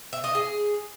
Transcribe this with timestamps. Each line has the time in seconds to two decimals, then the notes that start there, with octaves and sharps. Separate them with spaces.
0.13 E5
0.24 D#5
0.35 G#4